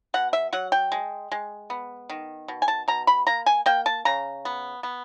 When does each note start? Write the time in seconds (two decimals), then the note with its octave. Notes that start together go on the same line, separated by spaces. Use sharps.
0.14 B2 F#5
0.33 E5
0.53 F#3 F#5
0.72 G5
0.92 G#3
1.32 G#3
1.70 B3
2.10 D#3
2.48 B2
2.62 G#5
2.68 A5
2.88 B2 A#5
3.07 B5
3.27 A#3 A#5
3.46 G#5
3.66 A#3 G5
3.86 A5
4.05 C#3 A#5
4.45 B3
4.83 B3